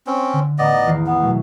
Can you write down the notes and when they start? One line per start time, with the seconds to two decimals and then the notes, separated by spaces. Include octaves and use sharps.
0.07 C4 C#4
0.33 D3
0.58 A1 B3 D#4 D5 D#5 A#5
0.86 E2 D#3 C7
1.07 B3
1.21 B2 F#3 A3